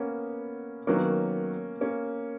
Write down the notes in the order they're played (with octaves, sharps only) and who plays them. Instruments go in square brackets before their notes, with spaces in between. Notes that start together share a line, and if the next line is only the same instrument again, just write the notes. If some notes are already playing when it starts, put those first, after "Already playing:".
Already playing: [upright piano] A#3 B3 C#4
[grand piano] D#3 F#3 B3 [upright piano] A#3 C#4
[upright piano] A#3 C#4